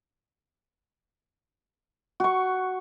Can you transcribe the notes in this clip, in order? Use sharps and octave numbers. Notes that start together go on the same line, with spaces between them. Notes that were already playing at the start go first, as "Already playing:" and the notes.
F#4 C#6